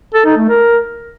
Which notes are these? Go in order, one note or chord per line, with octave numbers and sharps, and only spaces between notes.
A4
D#4
A3
A#4